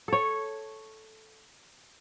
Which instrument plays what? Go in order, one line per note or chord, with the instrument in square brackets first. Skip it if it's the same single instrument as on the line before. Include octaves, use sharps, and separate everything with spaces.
[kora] A4 C#5